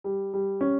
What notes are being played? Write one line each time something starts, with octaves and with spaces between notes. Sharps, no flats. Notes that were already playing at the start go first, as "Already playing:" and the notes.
G3
G3
C#4